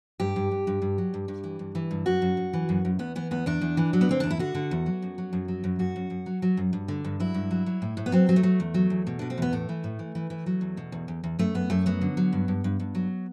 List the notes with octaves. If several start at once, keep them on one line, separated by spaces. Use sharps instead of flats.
G2 G4
G2
G2
G2
G2
F#3
G2
G2
E3
G2
E3
G2
F#2 F#4
F#2
F#2
E3
F#2
F#2
E2 B3
E3 B3
E2 B3
E2 D4
E2
E3
F#3
B3
D3 C4
E2 D4
E4
D3 F#4
D3
E2
F#3
F#2
F#3
F#2
F#3
F#2
F#2 F#4
F#2
F#2
F#3
F#3
F#2
G2
D3
G2
F#3 E4
G2
F#3
F#3
A2
A2
B3
F#3 C4
F#3
A3
F#3
E2
F#3
E2
B2
B2 D4
C4
E2 B3
A2 A3
E3
A2
E3
E3
E3
F#3
E2
B2
E2
E2
E2
F#2 A3
F#2 B3
F#2 A3
F#3 B3
D3
F#3
G2
G2
G2
G2
F#3